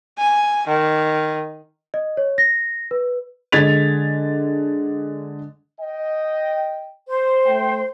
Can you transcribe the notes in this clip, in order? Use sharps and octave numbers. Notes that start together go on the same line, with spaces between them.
G#5
D#3
D#5
C#5
A#6
B4
D3 G#3 G#6 A6 B6 F7
D#5 G5
C5
A3 G5